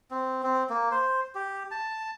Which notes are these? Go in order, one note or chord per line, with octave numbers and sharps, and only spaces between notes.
C4
C4
A#3
C5
G4
A5